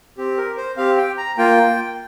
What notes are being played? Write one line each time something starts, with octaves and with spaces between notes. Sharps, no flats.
C4 G4
A#4
C5
C4 G4 F5
G5
A#5
A#3 F4 G5